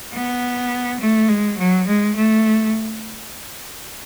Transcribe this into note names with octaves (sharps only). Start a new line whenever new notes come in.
B3
A3
G#3
F#3
G#3
A3